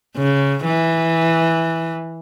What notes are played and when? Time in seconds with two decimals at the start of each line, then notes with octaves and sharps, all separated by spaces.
0.17 C#3
0.64 E3